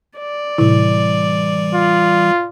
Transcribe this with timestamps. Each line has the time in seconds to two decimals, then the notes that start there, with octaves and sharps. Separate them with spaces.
0.18 D5
0.58 A2 C3 E3 G3 E4
1.74 F4